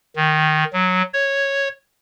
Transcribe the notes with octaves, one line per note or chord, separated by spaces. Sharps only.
D#3
F#3
C#5